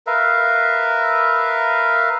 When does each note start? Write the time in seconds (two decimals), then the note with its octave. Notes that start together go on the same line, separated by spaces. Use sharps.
0.07 A#4 B4 E5 F5